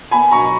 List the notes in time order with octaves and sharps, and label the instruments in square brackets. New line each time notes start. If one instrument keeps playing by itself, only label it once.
[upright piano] B3 G#5 B5
B2 A#5 C#6